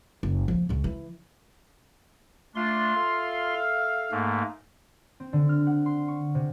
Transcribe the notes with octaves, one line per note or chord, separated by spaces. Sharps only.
F#1
F3 A#3
C#2 C#3
E3
A3 D4 F4 C6
A4 E5 F5
G#2 A3 A#3
C4
D3
F6
F#5
C6
C#6
C3